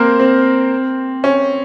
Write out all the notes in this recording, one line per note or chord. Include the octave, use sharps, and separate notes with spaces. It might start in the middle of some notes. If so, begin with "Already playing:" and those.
Already playing: A#3 C4 A#4 C5
C4
C#4